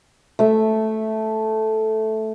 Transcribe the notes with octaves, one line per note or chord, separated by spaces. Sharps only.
A3 E5